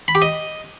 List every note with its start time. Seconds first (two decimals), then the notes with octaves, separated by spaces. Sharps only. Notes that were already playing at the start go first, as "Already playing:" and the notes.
0.08 B5
0.15 G4
0.22 D#5